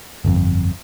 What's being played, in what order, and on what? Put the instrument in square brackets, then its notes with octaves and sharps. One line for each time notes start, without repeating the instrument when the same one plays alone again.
[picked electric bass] G1 F2